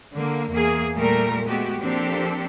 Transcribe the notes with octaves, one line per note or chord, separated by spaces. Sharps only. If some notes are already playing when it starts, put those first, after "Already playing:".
D3 A#3
E2 A#3 G#4
A#2 G3 A3 A#4
G#3 A3 B3 F#4 G4
F3 A#3 C4 D4 G4 A4